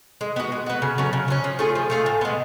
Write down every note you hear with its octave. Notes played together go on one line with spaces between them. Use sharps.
G#3
B3 F#4
G#3
B3 F#4
C#3
F#3 A3 C#4
C#3
F#3 A3 C#4
F3
A3 F4 G#4
F3
A3 F4 G#4
A2
G#3 B3